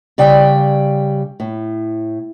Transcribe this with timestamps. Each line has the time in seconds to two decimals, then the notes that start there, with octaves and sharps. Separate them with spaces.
0.18 C#3 G3 D5 G5
1.40 A2